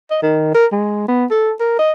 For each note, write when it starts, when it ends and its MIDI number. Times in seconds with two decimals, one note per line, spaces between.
0.11 0.18 75
0.22 0.54 51
0.54 0.66 70
0.72 1.08 56
1.08 1.25 59
1.30 1.52 69
1.60 1.78 70
1.79 1.92 75